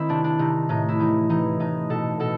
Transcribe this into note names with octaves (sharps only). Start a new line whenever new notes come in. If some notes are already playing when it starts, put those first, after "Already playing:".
Already playing: D#3 C4 E4
C3 D4
D4
C3 D#4
A2 D#4
E4
E3 D#4
E3 D#4
A2 D#4
B2 A4
B2 A4